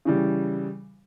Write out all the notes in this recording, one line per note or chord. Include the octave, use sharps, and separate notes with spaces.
C#3 E3 G3